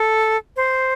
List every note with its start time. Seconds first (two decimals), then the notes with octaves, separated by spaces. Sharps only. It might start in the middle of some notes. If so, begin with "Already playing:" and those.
Already playing: A4
0.56 C5